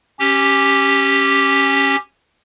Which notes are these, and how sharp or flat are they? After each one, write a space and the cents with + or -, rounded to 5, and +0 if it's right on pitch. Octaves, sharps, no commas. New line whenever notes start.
C#4 -10 G4 +0